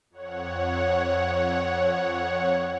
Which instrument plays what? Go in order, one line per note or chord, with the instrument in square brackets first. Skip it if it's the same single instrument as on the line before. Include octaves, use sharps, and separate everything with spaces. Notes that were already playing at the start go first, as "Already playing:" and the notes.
[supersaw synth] F2 C#5 F#5